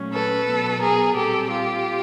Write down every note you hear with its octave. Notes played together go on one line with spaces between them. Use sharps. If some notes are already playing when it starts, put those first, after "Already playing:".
Already playing: A#2 F#3 A3 C#4
A4 B4
B2 F#3 B3
G#4 A#4
A#2 G3 C4 G4 A4
F4 G4